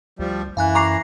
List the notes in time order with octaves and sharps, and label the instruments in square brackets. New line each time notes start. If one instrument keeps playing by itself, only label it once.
[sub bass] D2 [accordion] F3 G3
[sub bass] F#2 [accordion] E3 [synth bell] F5 G#5 F#6
[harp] A#5 [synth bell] C#6 D6 C7